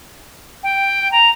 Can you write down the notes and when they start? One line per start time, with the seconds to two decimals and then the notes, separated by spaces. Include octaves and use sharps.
0.63 G5
1.11 A#5